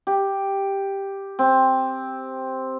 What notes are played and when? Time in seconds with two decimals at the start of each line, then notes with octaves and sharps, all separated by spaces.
0.07 G4
1.39 C4